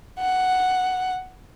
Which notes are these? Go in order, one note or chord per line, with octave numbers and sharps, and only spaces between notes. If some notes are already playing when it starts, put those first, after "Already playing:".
F#5